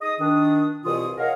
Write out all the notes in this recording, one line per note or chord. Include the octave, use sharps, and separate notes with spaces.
D#4 G#4 D#5 D#6
D#3 D4 D#6
C2 B2 E3 F4 D#6
G#4 A#4 C#5 D#5 F5 F#5